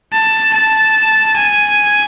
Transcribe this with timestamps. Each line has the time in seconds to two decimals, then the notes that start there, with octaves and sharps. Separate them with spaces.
0.13 A5
0.54 A5
1.37 G#5